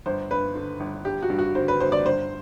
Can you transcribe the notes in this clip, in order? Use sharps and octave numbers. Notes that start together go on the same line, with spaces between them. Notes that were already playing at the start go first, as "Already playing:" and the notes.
G1 C5
G2 B4
D3
G1
G1 G4
F#4
G2
F#4
D3 C5
B4
G1 C5
D5
G1 C5